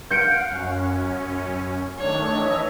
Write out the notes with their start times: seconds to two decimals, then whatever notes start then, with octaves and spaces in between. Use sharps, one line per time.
0.11 F5 F#5 G6 C#7 D7
0.50 F#2 C#4
1.98 D#3 A3 D4 C#5
2.35 E3 D#5 E5